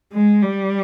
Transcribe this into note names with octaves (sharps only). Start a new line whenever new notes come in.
G#3
G3